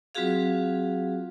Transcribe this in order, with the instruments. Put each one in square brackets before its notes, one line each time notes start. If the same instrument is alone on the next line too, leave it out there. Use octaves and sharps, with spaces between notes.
[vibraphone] F#3 C4 F4 F#4 G#4 F5